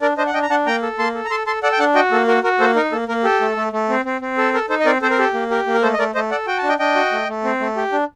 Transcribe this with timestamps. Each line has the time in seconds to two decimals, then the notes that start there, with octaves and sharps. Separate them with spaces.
0.01 D4 A#4 D5
0.17 D4 C5 D#5
0.27 F#5
0.34 D4 D#5 G5
0.42 A#5
0.50 D4 F#5 A5
0.66 A#3 G5 A#5
0.82 A4
0.99 A#3 A5 C6
1.15 A4
1.25 A#5
1.31 A4 A5 C6
1.46 A4 A5 C6
1.63 A4 D5 F#5
1.72 G5
1.79 D4 F#5 A5
1.95 F#4 D#5 G5
2.11 A#3 A4
2.28 F#4 A#4
2.44 F#4 A#4
2.60 A#3 A4 C5
2.76 D#4 A#4
2.92 A#3 A4
3.08 A#3 A#4
3.24 G4 A4
3.41 A3
3.56 A3
3.73 A3
3.89 C4
4.05 C4
4.21 C4
4.38 A4
4.54 A4 A#4
4.70 D#4 A4 C5
4.80 D#5
4.86 C4 A#4 D5
5.02 C4 A4 C5
5.11 A#4
5.18 G4 A4
5.34 A#3
5.51 G4 A#4
5.67 A#3
5.74 A#4
5.83 A3 A4 C5
5.93 D#5
5.99 A3 A#4 D5
6.15 A3 C5 D#5
6.31 A4 D5 F#5
6.47 F#4 G5
6.58 A5
6.63 D4
6.69 D#5 G5
6.79 D4 D#5 G5
6.95 F#4
7.12 A3
7.28 A3
7.44 C4
7.60 A3
7.77 G4
7.92 D4